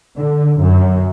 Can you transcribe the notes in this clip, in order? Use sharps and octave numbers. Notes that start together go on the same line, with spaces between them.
D3
F#2